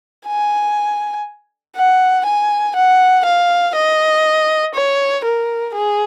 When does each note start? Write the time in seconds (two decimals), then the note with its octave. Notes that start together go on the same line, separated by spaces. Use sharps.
0.27 G#5
1.77 F#5
2.26 G#5
2.76 F#5
3.26 F5
3.75 D#5
4.75 C#5
5.25 A#4
5.74 G#4